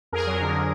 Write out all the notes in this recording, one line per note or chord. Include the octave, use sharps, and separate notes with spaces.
F2 G#4 A#4
F#3
D3